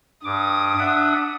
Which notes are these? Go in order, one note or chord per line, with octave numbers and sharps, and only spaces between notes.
G2 D6 D#6
D4 E5 F#5